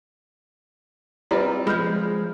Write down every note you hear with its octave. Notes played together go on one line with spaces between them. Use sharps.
G3 C4 F4 B4 D#5 A#5
F3 G#3 B5 F6 G6